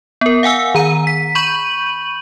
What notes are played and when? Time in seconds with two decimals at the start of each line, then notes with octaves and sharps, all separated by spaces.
0.21 B3 A#4
0.43 F5 F#5 G#5 E6
0.75 D#3 A#5 D#7
1.07 B6
1.35 B5 C#6 G6 D#7 F#7